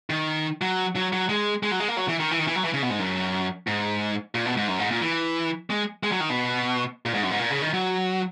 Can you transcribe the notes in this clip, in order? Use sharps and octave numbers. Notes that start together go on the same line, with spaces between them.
D#3
F#3
F#3
F#3
G#3
G#3
F#3
G#3
A#3
F#3
E3
D#3
E3
D#3
E3
F#3
E3
C#3
B2
G#2
F#2
G#2
A#2
B2
G#2
F#2
G#2
A#2
E3
G#3
G#3
F#3
D#3
B2
A#2
G#2
F#2
G#2
A#2
C#3
D#3
F#3